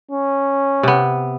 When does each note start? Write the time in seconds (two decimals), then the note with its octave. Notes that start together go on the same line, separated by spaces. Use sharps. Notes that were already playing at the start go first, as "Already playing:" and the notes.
0.12 C#4
0.83 C3 B3